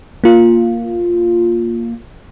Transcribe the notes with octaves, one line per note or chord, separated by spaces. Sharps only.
A#3 F4